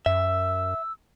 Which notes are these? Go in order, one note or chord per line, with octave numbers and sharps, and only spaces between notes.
F#2 E5 E6